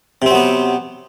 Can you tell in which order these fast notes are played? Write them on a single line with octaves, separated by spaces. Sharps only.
C3 C4 F#3 B3